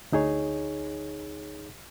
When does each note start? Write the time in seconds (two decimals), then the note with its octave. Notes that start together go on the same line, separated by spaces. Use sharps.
0.12 D2 D#4 G#4 C#5